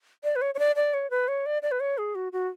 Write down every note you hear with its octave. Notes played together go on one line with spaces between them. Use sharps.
D5
B4
C#5
C#5
D5
D5
C#5
B4
C#5
D5
D5
B4
C#5
G#4
F#4
F#4